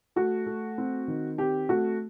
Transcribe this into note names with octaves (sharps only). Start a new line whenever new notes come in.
A3 F#4
A3
C4
D#3
C4 G4
A3 F#4